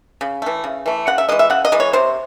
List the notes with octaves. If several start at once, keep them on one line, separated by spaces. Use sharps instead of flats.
C#3
E3 A3
C#3
E3 A3
C#3 F#5
E5
E3 G#3 D#5
E5
C#3 F#5
D#5
E3 G#3
C#5
C3 C5